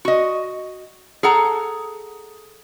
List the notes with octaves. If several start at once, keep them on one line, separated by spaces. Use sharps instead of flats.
F#4 D#5
G#4 A4 F#5 A#5